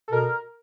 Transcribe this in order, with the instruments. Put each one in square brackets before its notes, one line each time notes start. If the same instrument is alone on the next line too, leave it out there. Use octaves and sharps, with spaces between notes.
[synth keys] A4
[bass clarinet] B2 [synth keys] A#4